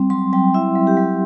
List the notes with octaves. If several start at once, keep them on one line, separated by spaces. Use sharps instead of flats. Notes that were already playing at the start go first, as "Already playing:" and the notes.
Already playing: G3 C4
F#3 C6
F#3 G5
E4 E5
F#3
G4
F#3